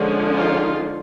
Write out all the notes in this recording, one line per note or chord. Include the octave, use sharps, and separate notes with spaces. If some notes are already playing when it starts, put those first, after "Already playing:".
Already playing: D3 F3 G#3 C#4
D#4 F4